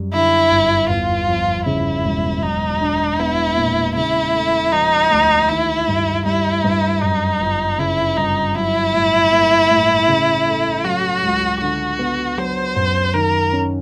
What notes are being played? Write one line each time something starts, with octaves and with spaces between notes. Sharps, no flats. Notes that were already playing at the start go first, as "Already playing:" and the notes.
Already playing: F#2 G3
D3 E4
G1
E2 F4
F3
C#3 E4
E1
F#3 D#4
D4
B3 E4
A#2
C#3 E4
A3
F3 D#4
D2
D#3 E4
G2
G3 E4
G2
F#2 D#4
G1
C#3 E4
G1 D#4
F#3 E4
A2
A#3
A2
C#3
A3
F#3 F#4
C#2
D3 F#4
B3
F#3 C5
F#2
D#3 A#4
C#4